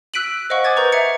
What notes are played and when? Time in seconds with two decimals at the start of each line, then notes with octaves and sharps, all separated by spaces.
0.14 E6 F#6 B6 D7 D#7 F#7
0.50 C5 D#5 F5 F#5 C#6
0.64 G#5 D6 D#6 G#6 A6
0.76 A#4 B4 A#5 C#6 D#6 G6
0.92 E5 A#5 G#6 C#7